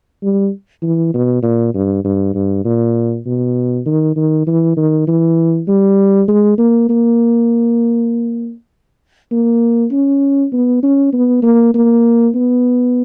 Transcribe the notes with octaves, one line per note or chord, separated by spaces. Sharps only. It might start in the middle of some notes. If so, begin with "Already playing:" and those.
G3
E3
B2
A#2
G2
G2
G2
A#2
B2
D#3
D#3
E3
D#3
E3
G3
G#3
A#3
A#3
A#3
C#4
B3
C#4
B3
A#3
A#3
B3